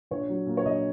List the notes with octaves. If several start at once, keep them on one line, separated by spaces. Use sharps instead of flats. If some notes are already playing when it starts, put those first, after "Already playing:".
A#1 C#5
F#3
A#2
C#5
A#1 D#5